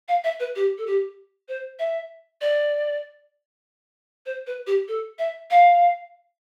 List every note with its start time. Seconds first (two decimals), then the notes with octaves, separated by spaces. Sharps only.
0.08 F5
0.24 E5
0.40 B4
0.56 G4
0.78 A4
0.87 G4
1.48 C5
1.79 E5
2.41 D5
4.26 C5
4.47 B4
4.67 G4
4.88 A4
5.19 E5
5.51 F5